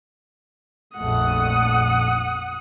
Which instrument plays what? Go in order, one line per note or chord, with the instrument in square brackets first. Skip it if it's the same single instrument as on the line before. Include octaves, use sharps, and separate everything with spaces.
[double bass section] A#1 F2 A3 [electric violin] F#5 D#6